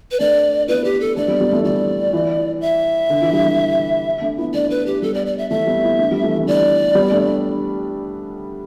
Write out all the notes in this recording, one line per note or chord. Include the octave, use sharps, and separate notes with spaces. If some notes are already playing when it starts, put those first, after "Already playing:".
B4
A3 D4 D5
B3 E4 B4
G4
A4
A3 D4 D5
G3 B3
G3 B3
E3 A3
D3 G3 D5
E3
E5
D3
E3
D3 G3
D3 G3
A3 D4
B3 E4
A3 D4 D5
B4
G4
G3 B3 A4
D5
D5
E5
E3 A3 E5
G3 B3
B3 E4
A3 D4
G3 B3
E3 A3
E3
D3 G3 D5
G3 B3
A3 D4